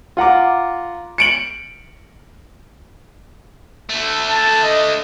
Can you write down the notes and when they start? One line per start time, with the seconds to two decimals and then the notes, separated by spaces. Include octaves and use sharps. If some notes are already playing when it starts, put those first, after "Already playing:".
0.17 F4 F#5 A#5 D6
1.18 C#7 D7 F#7
3.90 D3 A3
4.29 A5
4.63 D#5